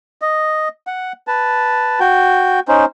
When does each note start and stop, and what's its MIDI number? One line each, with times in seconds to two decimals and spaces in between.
0.22 0.68 75
0.87 1.12 78
1.27 1.99 71
1.27 1.99 81
2.00 2.60 66
2.00 2.60 79
2.68 2.85 61
2.68 2.85 63
2.68 2.85 72